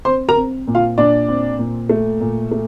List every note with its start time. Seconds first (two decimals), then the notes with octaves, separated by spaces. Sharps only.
0.05 C4 C5 C6
0.29 A#4 A#5
0.36 C4
0.67 A#2
0.75 F4 F5
0.98 A#2 D4 D5
1.29 C4
1.59 A#2
1.89 A3
2.20 A#2
2.51 A3